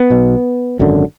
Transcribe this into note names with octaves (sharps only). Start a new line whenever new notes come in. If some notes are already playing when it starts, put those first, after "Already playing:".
Already playing: B3
B1 B2
G#1 F#2 D3